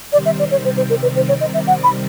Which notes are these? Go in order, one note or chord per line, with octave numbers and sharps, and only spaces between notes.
C3 D#3 G3 C4 D5
E5
D5
C#5
C5
C5
A#4
B4
C5
C#5
D#5
E5
F#5
B5